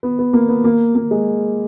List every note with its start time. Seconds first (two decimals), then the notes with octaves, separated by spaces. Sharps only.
0.03 B3
0.19 B3
0.33 A#3
0.49 B3
0.64 A#3
0.95 A#3
1.11 G#3